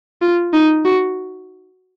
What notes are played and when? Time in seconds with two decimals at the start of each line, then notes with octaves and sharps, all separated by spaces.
0.22 F4
0.53 D#4
0.85 F#4